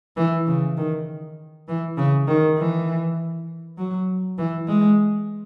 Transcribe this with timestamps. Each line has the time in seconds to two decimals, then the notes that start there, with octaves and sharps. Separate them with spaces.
0.17 E3
0.47 C#3
0.77 D#3
1.68 E3
1.98 C#3
2.28 D#3
2.57 E3
3.78 F#3
4.38 E3
4.68 G#3